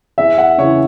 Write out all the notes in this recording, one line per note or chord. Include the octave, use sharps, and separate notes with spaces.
E2 E5
F#5
C#3 E3 C#5